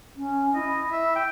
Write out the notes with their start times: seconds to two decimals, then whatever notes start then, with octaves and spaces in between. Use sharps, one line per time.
0.17 C#4
0.55 E4 D#5
0.92 E5
1.16 G5